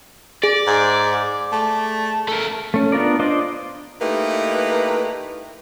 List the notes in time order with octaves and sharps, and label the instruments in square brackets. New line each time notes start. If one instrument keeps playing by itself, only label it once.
[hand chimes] G#4 [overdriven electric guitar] D5
[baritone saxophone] G#2
A3
[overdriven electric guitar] A3 A#4
[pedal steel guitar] A3 C#4
B3 D4 F4 A#4 D5
D4 F4 C5 D5 D#5
[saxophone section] A3 A#3 D#4 E4 G4 B4